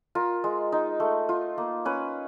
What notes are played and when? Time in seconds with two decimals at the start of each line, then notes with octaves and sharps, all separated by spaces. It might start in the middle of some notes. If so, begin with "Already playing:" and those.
0.15 F4 A#4
0.44 G#3
0.72 D#4
1.00 A3
1.29 F4
1.58 A#3
1.85 C#4 B4